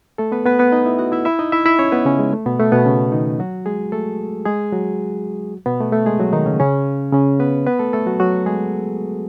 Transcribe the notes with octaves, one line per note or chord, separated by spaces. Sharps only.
A3 A4
B3 B4
B3 B4
B3 B4
D#4 D#5
E4 E5
F#4 F#5
E4 E5
E4 E5
D#4 D#5
E4 E5
E4 E5
C#4 C#5
B3 B4
C#3 C#4
G#3
A3
B2 B3
A3
B2 B3
C#3 C#4
D#3 D#4
F#3 F#4
G#3 G#4
A3 A4
G#3 G#4
F#3 F#4
B2 B3
A3
A3
G#3 G#4
F#3 F#4
D#3 D#4
C#3 C#4
C#3 C#4
C#3 C#4
B3 B4
B3 B4
A3 A4
A3 A4
F#3 F#4
F#3 F#4
G#3 G#4